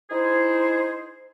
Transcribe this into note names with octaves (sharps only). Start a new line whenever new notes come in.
D#4 E4 G#4 C5